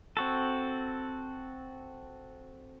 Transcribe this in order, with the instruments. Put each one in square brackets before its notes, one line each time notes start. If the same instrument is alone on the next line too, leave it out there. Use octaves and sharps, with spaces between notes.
[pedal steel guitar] C4 F#4 A4